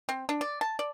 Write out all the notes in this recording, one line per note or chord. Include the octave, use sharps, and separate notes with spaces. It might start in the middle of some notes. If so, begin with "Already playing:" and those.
C4
D4
D5
A5
D5